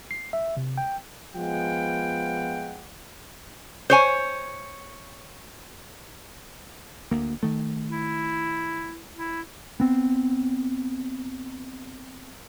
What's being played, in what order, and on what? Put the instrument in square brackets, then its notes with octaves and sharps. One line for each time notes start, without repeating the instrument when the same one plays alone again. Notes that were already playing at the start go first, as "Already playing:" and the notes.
[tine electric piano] C7
E5
C3
G5
[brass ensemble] F3 G#3 B3 F4 F#5 G5
[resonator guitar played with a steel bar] C5 C#5 G#5
[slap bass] D2 A#3
D#3 A3
[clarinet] E4
E4
[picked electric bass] B3 C4